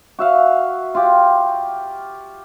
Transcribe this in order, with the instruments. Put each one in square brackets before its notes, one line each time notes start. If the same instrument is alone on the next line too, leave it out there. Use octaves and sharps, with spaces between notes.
[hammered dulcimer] F#4 E5 F5
F4 G4